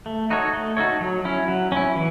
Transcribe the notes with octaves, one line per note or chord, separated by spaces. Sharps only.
A3
D#4 F#4 A4 C#5
A3
D#4 F#4 A4 C#5
F#3
C#4 E4
F#3
C#4 E4
E3